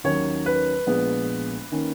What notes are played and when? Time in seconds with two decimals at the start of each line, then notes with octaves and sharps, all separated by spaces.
0.04 D#2 D#3 F#3 A#3 C#4 C#5
0.46 B4
0.87 A#1 A#2 G#3 B3
1.72 D#3 A#3 C#4